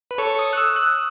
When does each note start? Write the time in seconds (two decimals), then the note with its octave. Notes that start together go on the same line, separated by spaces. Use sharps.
0.11 B4
0.18 A4 C#5 C#6
0.39 D#6
0.53 F#6
0.57 E6
0.76 F#6